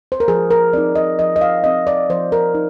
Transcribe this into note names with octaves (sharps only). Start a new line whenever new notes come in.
C5
A#4
F3 G#4
A#4
C4 D#4 D5
D#5
F3 D#5
D#5
F5
C4 D#4 D#5
D5
F3 C5
A#4
D#4